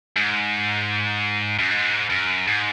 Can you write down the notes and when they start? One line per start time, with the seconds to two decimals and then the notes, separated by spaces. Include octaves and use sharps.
0.16 G#2
1.59 F#2
1.71 G#2
2.10 F#2
2.47 G#2